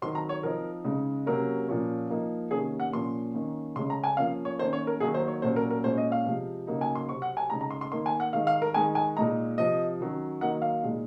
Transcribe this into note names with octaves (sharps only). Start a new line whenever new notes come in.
D#3 F#3 C4 C6
A#5
C#5
F3 C4 D#4 A#4
C#3 G#3 D#4
C3 F#3 A#3 C#4 A#4
A#2 F3 A#3 C#4
F3 A#3 D#4
C3 D#3 A#3 C#4 G#4
F#5
A#2 F3 A#3 C#4 C6
D#3 A#3 C#4
C#3 G#3 C#4 C6
A#5
G#5
F3 A#3 C#4 F5
C#5
D#3 A#3 C#4 C5
C#5
A#4
D#3 F#3 A#3 D#4 G#4
C5
C#5
A#2 F#3 C#4 C5
A#4
A#4
A#2 G#3 C#4 C5
D#5
F5
C3 F3 G#3
C#3 F#3 A#3 D#4
G#5
C6
C3 F#3 C4 C#6
F#5
G#5
C#3 G#3 D#4 A#5
A#5
C6
C6
D#3 A#3 D#4 C6
G#5
F#5
D#3 G#3 D#4 F5
F5
A#4
D#3 G#3 D#4 G#5
G#5
A#2 G#3 D#4 A#5
C3 F3 C4 D#5
D#3 F#3 C#4
D#3 F#3 A#3 D#4 F#5
F5
A#2 G#3 D#4